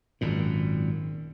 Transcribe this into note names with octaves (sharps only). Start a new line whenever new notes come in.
G#1 F#2 A#2